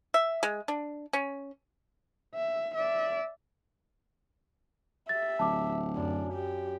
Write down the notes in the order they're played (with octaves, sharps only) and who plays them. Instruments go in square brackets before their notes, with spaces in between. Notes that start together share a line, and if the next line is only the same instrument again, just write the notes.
[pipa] E5
G#3
D4
C#4
[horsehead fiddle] E5
D5 E5
[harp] G4 [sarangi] E5 [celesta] A6
[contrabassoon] D1 [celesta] A5 D6
[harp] F#2 [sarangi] D4
[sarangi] G4